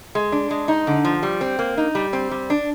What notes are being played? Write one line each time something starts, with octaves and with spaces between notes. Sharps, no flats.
G#3
D4
G#3
D#4
D3
F3
G3
C4
A#3
D#4
G3
C4
G3
D4